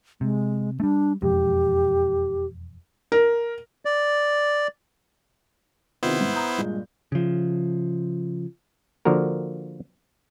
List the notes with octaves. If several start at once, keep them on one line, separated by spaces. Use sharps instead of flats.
C3 G#3
G3 A3 D4
E1 F2 G#3 G4
A#4
D5
C3 D#3 B3 E4 F4 C5
G#2
A#5 D#6 G6
G2 A#2 G#3
C#3 F3
D3 F3 A#3 F#4 A#4